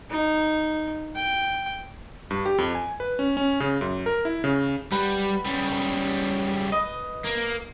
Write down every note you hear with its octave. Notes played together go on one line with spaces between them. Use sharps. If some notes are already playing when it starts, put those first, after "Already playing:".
D#4
G5
G2
G4
F2
G#5
B4
C#4
C#4
C#3
F#2
A#4
E4
C#3
G3 B4 F#5 B5
C#3 G3
B4 D#5
A#3